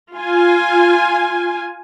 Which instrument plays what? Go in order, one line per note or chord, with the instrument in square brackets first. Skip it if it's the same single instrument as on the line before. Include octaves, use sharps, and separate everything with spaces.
[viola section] F4 G#5